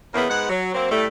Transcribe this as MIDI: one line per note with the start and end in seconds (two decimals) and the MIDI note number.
0.14 0.26 40
0.14 0.26 49
0.14 0.26 52
0.14 0.26 58
0.14 0.26 59
0.30 0.47 44
0.30 0.47 56
0.30 0.47 59
0.30 0.47 78
0.50 0.73 54
0.74 0.91 54
0.74 0.91 58
0.74 0.91 60
0.91 1.05 45
0.91 1.05 55
0.91 1.05 57